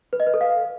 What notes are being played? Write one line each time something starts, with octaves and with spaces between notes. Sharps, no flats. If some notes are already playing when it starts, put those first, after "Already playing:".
B4
D#5
B4
A4
F5